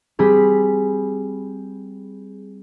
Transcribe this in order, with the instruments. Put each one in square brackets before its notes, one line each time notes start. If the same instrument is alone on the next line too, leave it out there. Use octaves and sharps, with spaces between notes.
[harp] G3 C4 G#4 B5